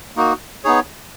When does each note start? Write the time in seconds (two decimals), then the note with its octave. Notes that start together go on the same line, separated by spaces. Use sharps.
0.16 A#3 D#4 F#4
0.64 B3 D#4 G#4 C#5